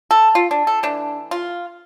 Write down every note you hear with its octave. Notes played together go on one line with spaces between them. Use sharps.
A4
F4
D4
A4
E3 A3 D4
F4